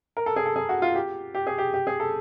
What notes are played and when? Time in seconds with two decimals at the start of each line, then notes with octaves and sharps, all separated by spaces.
0.17 A#4
0.26 A4
0.36 G#4
0.46 A4
0.56 G#4
0.69 F#4
0.82 F4
0.95 G4
1.34 G4
1.47 G#4
1.58 G4
1.74 G4
1.87 G#4
2.00 A4